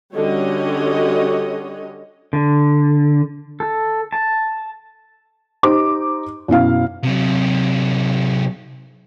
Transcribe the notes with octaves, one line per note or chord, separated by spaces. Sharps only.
D3 G3 C#4 F#4 C#5 D#5
D3
A4
A5
D#4 G4 C5 D6
F#2 B2 E4 F5
C3 F#3